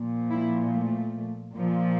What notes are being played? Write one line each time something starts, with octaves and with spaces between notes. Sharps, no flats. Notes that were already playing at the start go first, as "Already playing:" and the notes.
Already playing: A#2 F3
E4
A3
A#2 F3